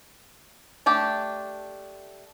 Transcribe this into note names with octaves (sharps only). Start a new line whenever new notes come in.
A3 D4 G4